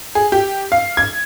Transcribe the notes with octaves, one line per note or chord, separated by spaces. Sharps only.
G#4
G4
F5
G#6